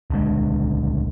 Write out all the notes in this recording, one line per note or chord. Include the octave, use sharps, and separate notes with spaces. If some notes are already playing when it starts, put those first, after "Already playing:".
D#1 C#2 D3 G#3